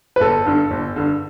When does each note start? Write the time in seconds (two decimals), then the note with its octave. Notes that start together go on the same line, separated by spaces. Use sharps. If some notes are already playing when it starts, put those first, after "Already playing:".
0.16 B4
0.20 G1 A4
0.46 G2 D3
0.71 G1
0.96 G2 D3